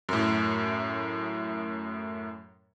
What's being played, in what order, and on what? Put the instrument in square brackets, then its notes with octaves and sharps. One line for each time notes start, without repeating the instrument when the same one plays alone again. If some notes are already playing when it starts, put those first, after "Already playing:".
[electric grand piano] F#2 A2